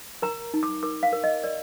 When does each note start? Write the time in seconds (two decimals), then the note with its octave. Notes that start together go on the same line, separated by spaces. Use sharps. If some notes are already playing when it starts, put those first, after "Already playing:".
0.22 A#4 A#5
0.54 D#4
0.63 D6
0.83 A#4 D6
1.03 F5
1.13 A#4
1.24 D#5
1.44 A#4 D5